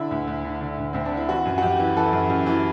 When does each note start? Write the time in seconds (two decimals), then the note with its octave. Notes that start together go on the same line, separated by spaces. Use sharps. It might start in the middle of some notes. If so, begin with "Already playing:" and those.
Already playing: D3 E4
0.11 D2
0.27 D2
0.45 D3
0.61 D3
0.78 D2
0.93 D2 C4
1.05 D4
1.12 D3
1.17 E4
1.28 E3 F#4
1.45 F#2
1.58 F#4
1.62 F#2 G4
1.79 E3
1.96 E3 A4
2.13 F#2
2.30 F#2
2.46 E3